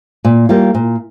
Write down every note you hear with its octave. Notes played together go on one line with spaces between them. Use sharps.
A#2
G3 A#3 F4
A#2